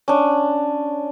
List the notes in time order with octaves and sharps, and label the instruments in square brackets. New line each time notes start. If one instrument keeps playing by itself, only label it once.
[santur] C#4 D4